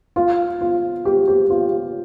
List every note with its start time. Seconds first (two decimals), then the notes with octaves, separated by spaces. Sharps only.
0.16 F4
0.61 F4
1.05 G4
1.27 G4
1.50 F4